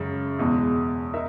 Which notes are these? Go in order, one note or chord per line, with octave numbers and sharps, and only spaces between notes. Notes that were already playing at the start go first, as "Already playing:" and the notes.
Already playing: F#2 C#3 G#3
E2 B2 G#3
D#4 A#4 E5